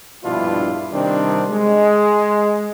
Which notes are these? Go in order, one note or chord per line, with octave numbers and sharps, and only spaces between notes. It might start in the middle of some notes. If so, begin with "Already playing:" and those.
A#1 G2 B2 D4 E4 F4
C3 D#3 G3 C4 D4
G#3